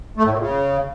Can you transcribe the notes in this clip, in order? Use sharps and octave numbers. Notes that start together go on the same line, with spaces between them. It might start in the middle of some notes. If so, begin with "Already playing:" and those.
A3
A2
A#2
C#3